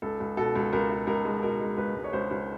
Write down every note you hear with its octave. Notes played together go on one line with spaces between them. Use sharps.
C#2 A4
C#2
B2 A4
C#2
C#2 A#4
C#2
C#2 A#4
G#3
B2 A#4
G#3
C#2 B4
C#2
C#5
C#2 C5
C#2